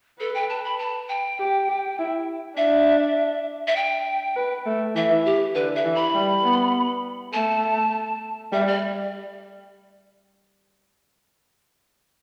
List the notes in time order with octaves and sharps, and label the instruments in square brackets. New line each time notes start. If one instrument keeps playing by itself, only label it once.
[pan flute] A4 [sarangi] B4
[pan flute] G5
A5
B5
A5
G5
[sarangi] G4
G4
E4
[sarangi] D4 [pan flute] E5
[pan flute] E5
G5
[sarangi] B4
A3
[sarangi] E3 [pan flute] E5
[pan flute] G4
[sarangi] D3 [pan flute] B4
[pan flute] E5
[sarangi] E3
[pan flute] B5
[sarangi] G3
B3
[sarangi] A3 [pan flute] A5
[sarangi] G3 [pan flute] E5
[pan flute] D5